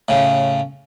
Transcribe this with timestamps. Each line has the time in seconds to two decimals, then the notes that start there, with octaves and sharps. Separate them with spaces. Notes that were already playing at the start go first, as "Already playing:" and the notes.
0.09 A2 C#3